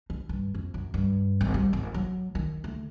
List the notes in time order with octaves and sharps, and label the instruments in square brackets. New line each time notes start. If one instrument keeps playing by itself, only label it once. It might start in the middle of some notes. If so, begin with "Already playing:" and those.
[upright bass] D#4
G2
F2
F#2
G2
G#1
G3
G#1
F#3
D#3
D2